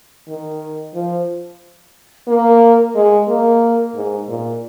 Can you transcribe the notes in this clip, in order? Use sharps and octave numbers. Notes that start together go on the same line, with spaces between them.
D#3
F3
A#3
G#3
A#3
G#2
A#2